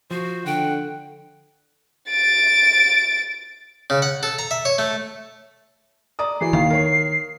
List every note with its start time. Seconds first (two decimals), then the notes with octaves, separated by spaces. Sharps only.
0.11 F3 F#4 C5
0.46 D3 F#5 G5
2.09 A6 D7
3.90 C#3
4.02 F#5
4.23 A4
4.39 A#5
4.51 E5
4.65 C#5
4.78 A3
6.19 D5 A#5 D#6
6.41 E3 E4 F#4 C7
6.53 D#2 D#3 F5
6.70 A#4 C#5